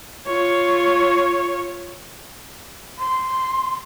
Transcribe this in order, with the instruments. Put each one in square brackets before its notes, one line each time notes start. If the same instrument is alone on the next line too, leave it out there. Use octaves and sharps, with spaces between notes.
[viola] F4 C#5
[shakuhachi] C6